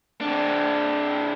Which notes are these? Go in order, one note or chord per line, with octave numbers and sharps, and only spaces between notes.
C3 D4